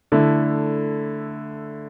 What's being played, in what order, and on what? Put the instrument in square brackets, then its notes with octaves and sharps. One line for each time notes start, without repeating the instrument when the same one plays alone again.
[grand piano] D3 A3 E4